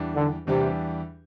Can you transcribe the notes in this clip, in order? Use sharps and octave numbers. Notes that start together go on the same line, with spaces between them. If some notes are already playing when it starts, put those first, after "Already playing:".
Already playing: E2 E3 G3 D4 G4
D3
E2 C3 E3 G3 D4 G4